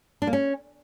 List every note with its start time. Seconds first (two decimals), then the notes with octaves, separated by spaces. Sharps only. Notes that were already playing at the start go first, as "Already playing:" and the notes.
0.22 D4
0.27 A#3
0.33 C#4